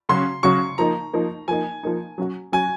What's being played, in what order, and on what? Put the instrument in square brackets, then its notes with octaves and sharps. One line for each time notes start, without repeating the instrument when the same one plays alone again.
[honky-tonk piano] C#3 F#3 C#4 F#4 [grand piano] C6
[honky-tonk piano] C#3 F#3 C#4 F#4 [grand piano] C#6
[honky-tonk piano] F3 A#3 D#4 [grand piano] A#5
[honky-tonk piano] F3 A#3 D#4
[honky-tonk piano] F3 A#3 D#4 [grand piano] G#5
[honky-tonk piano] F3 A#3 D#4
F#3 C#4 F#4
[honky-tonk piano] F#3 C#4 F#4 [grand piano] G#5